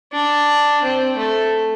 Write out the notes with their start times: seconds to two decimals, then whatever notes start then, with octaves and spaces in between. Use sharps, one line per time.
0.12 D4
0.82 C4
1.17 A3